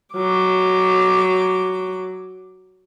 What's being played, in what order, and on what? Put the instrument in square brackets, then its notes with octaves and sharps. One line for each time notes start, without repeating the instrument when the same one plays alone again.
[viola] F#3 D6